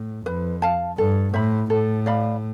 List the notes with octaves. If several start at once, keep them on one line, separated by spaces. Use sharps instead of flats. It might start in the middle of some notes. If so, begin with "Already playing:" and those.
Already playing: A2
F2 B4
F5 A5
G2 A4
A2 C5 E5 B5
A2 A4
D5 F5 B5